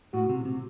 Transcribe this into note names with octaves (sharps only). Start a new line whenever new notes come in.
A2 F#4
C3
C3